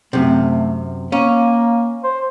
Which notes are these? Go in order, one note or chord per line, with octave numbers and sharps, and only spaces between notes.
F#2 C3 A3
A#3 C#4
C5